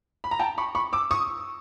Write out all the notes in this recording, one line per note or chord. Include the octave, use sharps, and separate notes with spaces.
B5
A#5
G5 A5
B5 C#6
B5 C#6
D6 E6
C#6 D#6